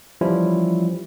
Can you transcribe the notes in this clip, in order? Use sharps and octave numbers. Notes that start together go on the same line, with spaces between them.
E3 F3 G3 C#4 E4 F4